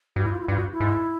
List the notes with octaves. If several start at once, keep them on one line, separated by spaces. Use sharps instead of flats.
G2 F#4
E4
F4
E4
G2 F4
F#4
E4
G#2